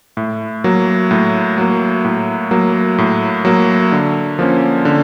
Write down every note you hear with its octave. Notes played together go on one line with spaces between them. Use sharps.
A2
F#3 A#3
A2
F#3 A#3
A2
F#3 A#3
A2
F#3 A#3
D3
F3 A#3 C#4
D3